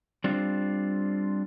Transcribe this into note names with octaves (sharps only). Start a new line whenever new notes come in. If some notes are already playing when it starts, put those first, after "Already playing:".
G3 C4 D4 F4